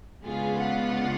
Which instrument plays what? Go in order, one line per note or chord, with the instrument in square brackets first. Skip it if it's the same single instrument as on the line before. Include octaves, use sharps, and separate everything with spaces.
[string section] C#3 G#3 B3 D4 F4 G#4
F#5